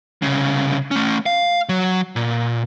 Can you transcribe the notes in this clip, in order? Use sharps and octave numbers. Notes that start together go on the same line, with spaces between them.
C2 C#3
A3 C#4
F5
F#3
A#2